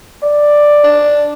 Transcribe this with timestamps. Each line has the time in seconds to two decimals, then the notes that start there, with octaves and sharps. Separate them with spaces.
0.23 D5
0.84 D4